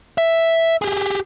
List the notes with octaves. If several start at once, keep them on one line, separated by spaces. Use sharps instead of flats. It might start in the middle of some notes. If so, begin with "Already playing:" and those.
E5
G4 G#4